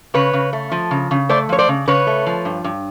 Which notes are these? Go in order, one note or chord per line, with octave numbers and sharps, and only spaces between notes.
C#3 B4 C#5
C#3
A3
F3
C#3
C#3
A3 C5 D5
F3 C#5
C5 D5
C#3
C#3 B4 C#5
A3
F3
G2
G2